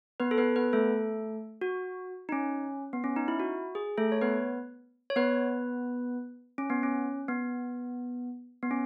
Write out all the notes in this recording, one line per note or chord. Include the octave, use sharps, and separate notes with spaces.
B3 B4
A4
B3 B4
B3 B4
A3 A4
F#4
D#4
C#4
B3
C#4
D#4
E4
F#4
G#4
A3 A4
C#5
B3 B4
C#5
B3 B4
C#4
B3
C#4
B3
B3
C#4